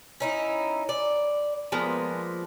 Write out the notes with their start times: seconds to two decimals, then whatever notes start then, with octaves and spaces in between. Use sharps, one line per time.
0.20 C#4 D#4 E4
0.89 D5
1.72 F3 G#3 A#3 B3